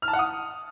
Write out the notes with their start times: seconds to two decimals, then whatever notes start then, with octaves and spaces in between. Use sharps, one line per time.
0.02 F6
0.08 A5
0.13 F#5
0.19 D#6